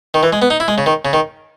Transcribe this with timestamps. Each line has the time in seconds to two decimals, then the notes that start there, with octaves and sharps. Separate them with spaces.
0.14 D#3
0.23 E3
0.33 G#3
0.42 B3
0.50 D#4
0.60 E4
0.68 G#3
0.78 C#3
0.86 D#3
1.05 C#3
1.13 D#3